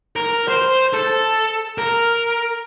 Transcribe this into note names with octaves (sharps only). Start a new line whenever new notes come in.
A#4
C5
A4
A#4